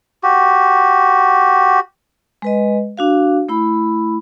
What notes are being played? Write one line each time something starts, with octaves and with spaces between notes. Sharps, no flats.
F#4 G4
G#3 B4 D#5
D4 F#4 F5
A3 E4 B5